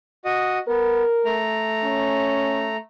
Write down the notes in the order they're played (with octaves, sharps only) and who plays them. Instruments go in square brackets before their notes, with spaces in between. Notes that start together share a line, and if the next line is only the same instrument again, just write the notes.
[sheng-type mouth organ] F#4 D#5 D#6
[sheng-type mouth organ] B3 [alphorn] A#4
[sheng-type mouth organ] A3 A#5
[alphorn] C#4